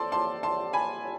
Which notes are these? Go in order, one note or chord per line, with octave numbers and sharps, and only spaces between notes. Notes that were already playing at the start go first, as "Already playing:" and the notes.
Already playing: F2 A4 C5 D5 A5 C6
A5 C6
A5 C6
G#5 B5